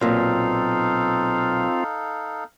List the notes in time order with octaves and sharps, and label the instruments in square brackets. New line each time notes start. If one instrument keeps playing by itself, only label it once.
[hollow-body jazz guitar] B1 A#2 [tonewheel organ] C4 F4 [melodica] D#4 A4 F5